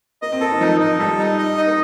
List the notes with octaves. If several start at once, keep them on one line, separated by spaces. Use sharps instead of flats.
A#3 D#5
C4
A#3 A4
D#3
F3 D#4
D#3 D#4
G3 A4
D#4
D#5
D#4
A#3